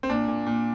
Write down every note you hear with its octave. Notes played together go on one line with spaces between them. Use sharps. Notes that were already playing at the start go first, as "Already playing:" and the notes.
C4
A#2 D4
A#2
A#2